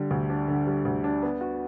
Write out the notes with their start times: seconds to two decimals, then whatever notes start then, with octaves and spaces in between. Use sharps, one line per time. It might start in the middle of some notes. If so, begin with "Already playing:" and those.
Already playing: D3 G3
0.11 D2
0.30 D4
0.48 D3
0.67 G3
0.85 D2
1.04 D4
1.22 B3
1.41 F#4